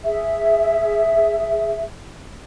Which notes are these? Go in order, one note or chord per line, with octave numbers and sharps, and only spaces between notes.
G#4 E5